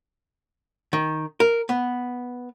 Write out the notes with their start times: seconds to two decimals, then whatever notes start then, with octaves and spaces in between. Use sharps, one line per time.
0.93 D#3
1.40 A#4
1.69 B3